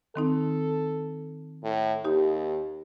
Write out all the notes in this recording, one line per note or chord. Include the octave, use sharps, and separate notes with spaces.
D#3 C4 D#4 A4
A2
D#2 D#4 G4